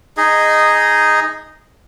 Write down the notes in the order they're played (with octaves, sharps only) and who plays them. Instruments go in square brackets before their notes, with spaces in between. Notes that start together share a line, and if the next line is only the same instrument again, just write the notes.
[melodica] D#4 G#4 D#5